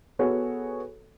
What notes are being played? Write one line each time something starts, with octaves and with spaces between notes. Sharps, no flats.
B3 F#4 G#4 A4 C#5